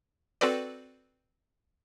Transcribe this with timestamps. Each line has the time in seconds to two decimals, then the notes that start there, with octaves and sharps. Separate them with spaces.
0.41 C4 F#4 A4 B4 D5